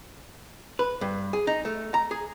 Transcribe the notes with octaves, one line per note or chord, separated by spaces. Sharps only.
B4
G2
G#4
D#4
A3
A#5
G#4